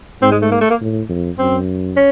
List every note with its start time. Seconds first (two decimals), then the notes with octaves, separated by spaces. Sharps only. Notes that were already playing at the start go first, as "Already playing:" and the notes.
0.22 G#2 C4
0.32 G#3
0.42 A3
0.52 A#3
0.61 A3
0.70 A#3
0.81 A2
1.09 F2
1.38 F#2 C4
1.96 C#4